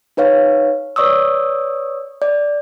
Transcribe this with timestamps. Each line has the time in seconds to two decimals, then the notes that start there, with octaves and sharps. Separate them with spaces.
0.17 D#4 B4 C#5 F5
0.96 B4 C#5 D5 C#6 D#6 E6
2.22 D5